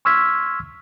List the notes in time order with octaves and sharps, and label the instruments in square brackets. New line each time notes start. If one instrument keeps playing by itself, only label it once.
[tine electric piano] C6 C#6 E6 F6 G#6 B6